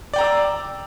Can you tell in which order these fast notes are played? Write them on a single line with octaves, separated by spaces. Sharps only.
D5 G5 A#5 E6 D6